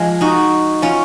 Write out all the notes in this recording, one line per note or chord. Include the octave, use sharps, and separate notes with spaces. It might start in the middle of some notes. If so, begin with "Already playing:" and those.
Already playing: F3 G#3
D#4 F#4
C#4 F4